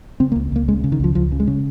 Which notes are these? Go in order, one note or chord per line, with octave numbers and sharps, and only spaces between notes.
C#3 C4
A#3
C#2
C#2 A#3
C#3 G#3
C#3
D#3
C#2 F3
C#2 F3
C#3
G#3
C#3